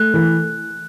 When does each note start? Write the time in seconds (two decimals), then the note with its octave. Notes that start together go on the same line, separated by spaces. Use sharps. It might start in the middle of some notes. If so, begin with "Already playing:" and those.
Already playing: A3 F#6
0.14 E3